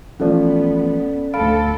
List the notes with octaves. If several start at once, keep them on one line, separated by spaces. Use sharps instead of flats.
E3 F3 A3 B3 C#4 A4 D5
D2 A4 F5 B5 D7